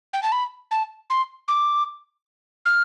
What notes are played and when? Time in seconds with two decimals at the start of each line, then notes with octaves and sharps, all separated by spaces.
0.13 G5
0.23 A5
0.32 B5
0.71 A5
1.10 C6
1.48 D6
2.66 F6